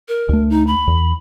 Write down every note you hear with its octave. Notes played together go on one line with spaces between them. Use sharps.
A#4
D2 A3
D#4
B5
E2